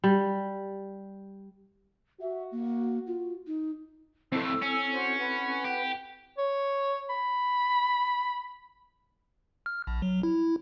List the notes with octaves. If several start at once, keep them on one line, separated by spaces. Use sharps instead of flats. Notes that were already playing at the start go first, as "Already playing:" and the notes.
G3
F#4 E5
A#3
F4
D#4
F2 A2 C4 E4 A4 E6
C#4
F#4 C5
B4 F#5
G4
C#5
B5
F6
A#1
F#3
E4